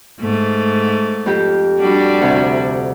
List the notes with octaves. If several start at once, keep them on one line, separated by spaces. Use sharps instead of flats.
G#2 A3
F2 F4 G4
G3 D4 F#4
D2 C3